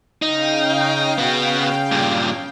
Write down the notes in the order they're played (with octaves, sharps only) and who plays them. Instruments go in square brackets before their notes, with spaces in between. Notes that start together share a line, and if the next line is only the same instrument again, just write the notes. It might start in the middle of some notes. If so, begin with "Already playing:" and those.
[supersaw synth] C#3 F5 G5 [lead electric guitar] D#4
[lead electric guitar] B3 F#4
G2 A#2